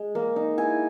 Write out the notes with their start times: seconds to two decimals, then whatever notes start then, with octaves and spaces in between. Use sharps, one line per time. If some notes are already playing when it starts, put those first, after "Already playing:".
Already playing: G#3
0.15 A#3
0.36 D#4
0.58 E4 G#5